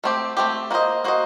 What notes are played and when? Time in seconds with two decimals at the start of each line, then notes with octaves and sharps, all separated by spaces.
0.04 A3 C4 G4
0.37 A3 C4 G4
0.71 A#3 F#4 C5 D#5
1.04 A#3 F#4 C5 D#5